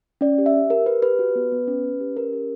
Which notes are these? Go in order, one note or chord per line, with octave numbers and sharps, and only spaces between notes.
C#4 D5
G4
E5
G4
G4 A#4
G4 B4
G4 B4
F#4
B3
B3
C#4
C#4
G4
C#4 A#4
G4